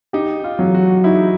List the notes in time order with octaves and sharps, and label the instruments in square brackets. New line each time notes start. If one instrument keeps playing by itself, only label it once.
[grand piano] D#4 [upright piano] G4
[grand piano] F4
[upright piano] F#3
[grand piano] F#4
[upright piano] D#4 [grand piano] E4